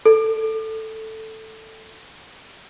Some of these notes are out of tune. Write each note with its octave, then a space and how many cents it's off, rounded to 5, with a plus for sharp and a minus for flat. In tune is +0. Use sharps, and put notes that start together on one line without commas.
A4 +5